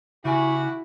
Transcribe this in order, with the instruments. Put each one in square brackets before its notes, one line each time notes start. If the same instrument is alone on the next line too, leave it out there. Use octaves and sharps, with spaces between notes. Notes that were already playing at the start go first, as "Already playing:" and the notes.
[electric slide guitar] C#3 G#5 [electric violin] E4 [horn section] F#4 G4